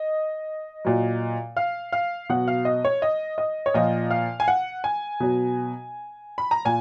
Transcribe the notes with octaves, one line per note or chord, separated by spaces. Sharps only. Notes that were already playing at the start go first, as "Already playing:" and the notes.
Already playing: D#5
A#2 F#3
F5
F5
B2 F#3 F#5
F5
D#5
C#5
D#5
D#5
C#5
A#2 F3 D#5
F5
G#5
F#5
G#5
B2 F#3
B5
A#5
A#2 G#5